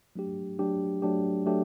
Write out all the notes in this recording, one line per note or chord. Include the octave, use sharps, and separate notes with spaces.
F#3 A3 D4 G4
F#3 A3 D4 G4
F#3 A3 D4 G4
F#3 A3 D4 G4